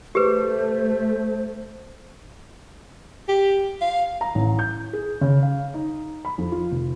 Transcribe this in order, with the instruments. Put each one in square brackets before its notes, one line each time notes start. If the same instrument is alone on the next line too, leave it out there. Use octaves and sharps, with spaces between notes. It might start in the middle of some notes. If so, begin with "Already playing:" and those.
[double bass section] A3 [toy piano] G4 G#4 B4 [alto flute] C5
[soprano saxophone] G4
F5
[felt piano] A#5
A1
G6
G#4
C#3
F5
D#4
B5
F2
F4
F1